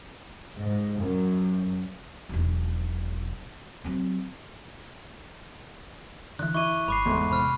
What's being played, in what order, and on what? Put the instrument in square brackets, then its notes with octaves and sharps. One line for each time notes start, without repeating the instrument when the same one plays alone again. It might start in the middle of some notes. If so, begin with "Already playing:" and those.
[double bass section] G#2
F#2
[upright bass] E1 B1
F#3 C4
[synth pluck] D3 E3 [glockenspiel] F#6
[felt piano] E4 [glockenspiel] C#6 D6 D#7
[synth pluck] G1 [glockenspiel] B5 D6 C7
[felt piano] E2 G#2 A3 [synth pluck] C6
[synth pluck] C3 [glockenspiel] B5 F6